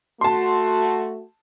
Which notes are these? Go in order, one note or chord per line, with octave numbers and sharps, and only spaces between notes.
A3 F#4 A5 C6